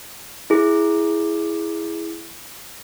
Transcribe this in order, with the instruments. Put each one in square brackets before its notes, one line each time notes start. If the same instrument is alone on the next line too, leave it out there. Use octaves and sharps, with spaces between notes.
[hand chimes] E4 G#4